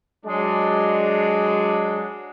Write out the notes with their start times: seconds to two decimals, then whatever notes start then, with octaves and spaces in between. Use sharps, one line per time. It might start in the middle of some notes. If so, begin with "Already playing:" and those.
0.24 F#3 G#3 D4